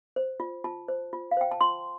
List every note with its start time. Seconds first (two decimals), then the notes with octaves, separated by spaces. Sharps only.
0.16 C5
0.40 F4
0.64 F4 A5
0.88 C5
1.13 F4
1.31 F5
1.37 C5 G5
1.51 A5
1.61 F4 C6